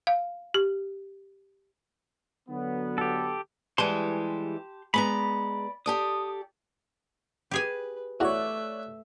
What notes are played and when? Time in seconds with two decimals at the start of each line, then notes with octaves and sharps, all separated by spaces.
0.07 F5
0.54 G4
2.49 D3 F#3 B3
2.98 G4 A4
3.78 E3 G3 G#3 G4 A5 C6
4.94 G#3 B3 D5 A#5 B5
5.86 G4 A4 D5 D#6
7.51 G4 G#4 B4 G#5
8.20 E2 A3 F#4 C#5 D5 E5 A#5 F#6